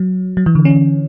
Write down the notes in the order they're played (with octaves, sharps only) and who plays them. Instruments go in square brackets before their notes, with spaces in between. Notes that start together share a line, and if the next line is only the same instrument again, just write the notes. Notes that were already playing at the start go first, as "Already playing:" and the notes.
Already playing: [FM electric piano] F#3
F#3
E3
D3
C#4